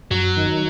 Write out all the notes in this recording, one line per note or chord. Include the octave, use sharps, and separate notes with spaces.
F#2 F#3
D#3